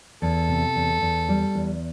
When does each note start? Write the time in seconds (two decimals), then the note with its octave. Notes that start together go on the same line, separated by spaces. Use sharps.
0.22 E2 A4
0.49 C3
0.76 E2
1.02 E2
1.29 G3
1.55 E2